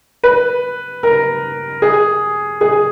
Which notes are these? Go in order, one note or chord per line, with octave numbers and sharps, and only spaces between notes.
B4
A#4
G#4
G#4